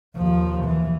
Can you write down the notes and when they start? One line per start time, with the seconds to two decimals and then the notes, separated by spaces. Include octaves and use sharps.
0.16 D#2 F3
0.64 E3